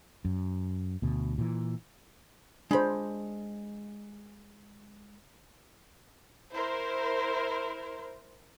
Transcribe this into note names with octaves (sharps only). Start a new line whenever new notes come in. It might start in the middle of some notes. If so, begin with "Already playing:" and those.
F#2
D2 B2
A#2 E3
G#3 D4 C5 B5
E4 A#4 C5